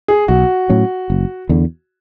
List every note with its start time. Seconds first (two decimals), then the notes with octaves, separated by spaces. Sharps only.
0.08 G#4
0.28 B1 F#4
0.69 A2 F#3 C#4
1.10 F#1
1.49 E2 D3